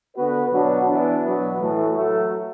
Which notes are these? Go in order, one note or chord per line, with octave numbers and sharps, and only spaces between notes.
D3 B3 F#4 B4
B2 F#3 D4 F#4 B4
E3 B3 D4
B2 F#3 B3
A2 E3 A3 F#4 A4
F#3 A3 F#4 A4